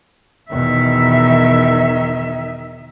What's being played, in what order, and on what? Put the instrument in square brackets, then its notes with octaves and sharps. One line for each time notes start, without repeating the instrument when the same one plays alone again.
[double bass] E2 B2 [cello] D#3 E5